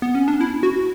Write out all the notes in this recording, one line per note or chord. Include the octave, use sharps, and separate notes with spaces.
B3
C#4
D4
E4
F#4